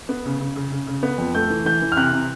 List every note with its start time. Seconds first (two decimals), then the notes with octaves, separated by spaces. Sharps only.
0.09 B3
0.26 C#3
0.41 C#3
0.56 C#3
0.72 C#3
0.87 C#3
1.03 B3
1.18 F2
1.35 A3 G6
1.50 E3
1.65 E3 G6
1.82 E3
1.92 F6
1.97 C3 F#6
2.12 C3